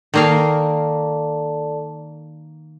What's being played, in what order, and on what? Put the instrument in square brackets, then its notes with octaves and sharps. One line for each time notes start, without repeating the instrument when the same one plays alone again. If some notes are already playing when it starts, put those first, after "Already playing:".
[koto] D#3 A#3 F5 [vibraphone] A4 D5 A5